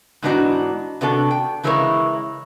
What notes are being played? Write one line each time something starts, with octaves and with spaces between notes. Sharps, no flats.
G#2 E3 B3 D4 D#4 F#4
C3 B3 D4 F#4 A4
G5
C#3 E3 G#3 E4 A#4 C#5